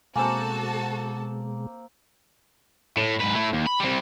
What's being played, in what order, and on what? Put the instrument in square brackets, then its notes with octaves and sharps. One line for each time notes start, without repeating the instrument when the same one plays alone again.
[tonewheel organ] B2 G#3 [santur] A#3 C4 [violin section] F#4 A4 A5 [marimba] G#5
[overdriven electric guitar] A2
G#2 B4
A3 E4
D#2
B5
G3 C4